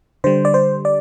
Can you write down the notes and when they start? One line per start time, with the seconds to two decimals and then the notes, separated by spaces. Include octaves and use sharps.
0.24 D3 G3 C5
0.45 D5
0.54 C5
0.85 D5